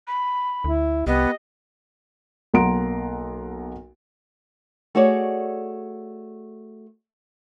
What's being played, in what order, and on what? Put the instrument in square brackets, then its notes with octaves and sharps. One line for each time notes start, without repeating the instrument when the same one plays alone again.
[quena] B5
[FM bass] D2 [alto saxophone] E4
[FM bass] C2 [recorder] B3 [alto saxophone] G4 [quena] D#5
[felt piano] B1 A#3 F#5 A#5 C6 D7
[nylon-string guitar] A3 F#4 G#4 C#5 D5